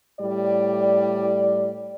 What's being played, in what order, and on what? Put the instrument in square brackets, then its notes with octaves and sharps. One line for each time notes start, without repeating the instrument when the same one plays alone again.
[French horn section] A2 G3 D5